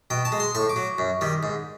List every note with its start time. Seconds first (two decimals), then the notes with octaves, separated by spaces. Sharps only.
0.10 B2 G5
0.25 A5
0.32 G#3
0.40 C6
0.55 A2 C#6
0.69 D6
0.76 F#3
0.98 F#2
1.21 D#3 G3
1.43 G#2